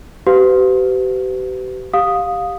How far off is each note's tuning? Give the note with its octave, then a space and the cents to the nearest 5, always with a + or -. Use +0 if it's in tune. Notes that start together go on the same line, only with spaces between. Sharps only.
G4 -40 B4 +35 F5 +15
G4 +0 F5 +20 D#6 +0